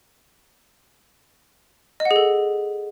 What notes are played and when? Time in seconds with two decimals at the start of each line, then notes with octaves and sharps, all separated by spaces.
2.00 D#5
2.05 F#5
2.11 G#4
2.16 A4